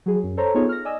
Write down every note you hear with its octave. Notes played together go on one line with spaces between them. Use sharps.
F#3 G#4
F#2
A4 C5 C#5 A#5
B3 D#4 F4 G#4 C#5
F6 A#6
D5 D#5 G#5 D#6 E6